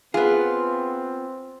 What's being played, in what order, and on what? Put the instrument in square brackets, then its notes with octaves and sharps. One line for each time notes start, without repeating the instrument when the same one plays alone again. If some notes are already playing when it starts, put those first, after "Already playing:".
[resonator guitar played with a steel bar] B3 F4 [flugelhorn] C4 [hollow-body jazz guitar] G#4